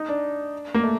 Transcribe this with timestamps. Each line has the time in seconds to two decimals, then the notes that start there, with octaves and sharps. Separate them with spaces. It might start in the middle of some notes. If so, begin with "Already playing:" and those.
Already playing: D#4
0.09 D4
0.74 A#3
0.83 A3